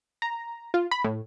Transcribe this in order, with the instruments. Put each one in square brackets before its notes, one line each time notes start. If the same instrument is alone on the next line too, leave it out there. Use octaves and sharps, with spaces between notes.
[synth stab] A#5
F4
B5
A2